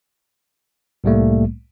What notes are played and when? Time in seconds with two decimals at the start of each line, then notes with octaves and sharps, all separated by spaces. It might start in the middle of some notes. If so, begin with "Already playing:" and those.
1.04 C2 A2 G3 A3 A#3